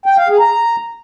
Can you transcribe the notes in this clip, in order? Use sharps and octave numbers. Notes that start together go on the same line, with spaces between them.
G5
F5
G#4
A#5